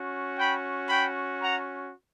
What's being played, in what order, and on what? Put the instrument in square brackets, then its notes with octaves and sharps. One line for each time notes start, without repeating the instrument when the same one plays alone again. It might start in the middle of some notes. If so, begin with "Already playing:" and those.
Already playing: [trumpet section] C#4 F#4
G5 B5
G5 B5
F#5 A#5